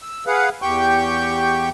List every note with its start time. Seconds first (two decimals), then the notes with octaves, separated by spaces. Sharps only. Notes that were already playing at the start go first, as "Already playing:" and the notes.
0.02 E6
0.27 G#4 B4 F5 F#5
0.62 E2 G4 G5 C#6 G6